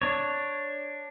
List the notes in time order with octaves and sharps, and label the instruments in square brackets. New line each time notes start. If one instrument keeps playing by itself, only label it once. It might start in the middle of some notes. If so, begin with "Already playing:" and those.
[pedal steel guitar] D4 C#5